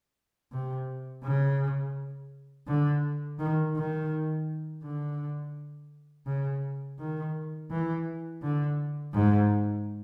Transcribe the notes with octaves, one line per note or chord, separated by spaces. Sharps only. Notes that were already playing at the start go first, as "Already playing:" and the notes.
C3
C#3
D3
D#3
D#3
D3
C#3
D#3
E3
D3
G#2